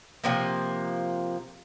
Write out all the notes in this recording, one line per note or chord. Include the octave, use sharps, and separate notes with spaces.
C3 F3 A#3